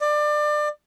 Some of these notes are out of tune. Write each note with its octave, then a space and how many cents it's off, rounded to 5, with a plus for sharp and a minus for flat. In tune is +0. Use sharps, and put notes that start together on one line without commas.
D5 +25